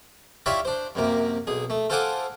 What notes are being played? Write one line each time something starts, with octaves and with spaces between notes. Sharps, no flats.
E4 F4 G4 C#5 D5 E5
D4 C5
F#2 C3 A#3
B1 G#4
A3
F4 A4 C5 F#5 G#5 D6